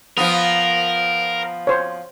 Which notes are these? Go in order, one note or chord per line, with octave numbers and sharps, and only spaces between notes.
F3 B3 A#4
C5 C#5